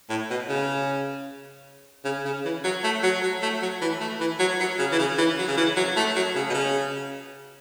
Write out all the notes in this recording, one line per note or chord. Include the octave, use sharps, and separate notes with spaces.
A2
B2
C#3
C#3
C#3
E3
F#3
A3
F#3
F#3
A3
F#3
E3
A3
E3
F#3
F#3
C#3
E3
C#3
E3
F#3
C#3
E3
F#3
A3
F#3
C#3
B2
C#3